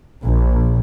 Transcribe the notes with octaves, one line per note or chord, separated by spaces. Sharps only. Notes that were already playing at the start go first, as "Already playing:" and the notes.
A#1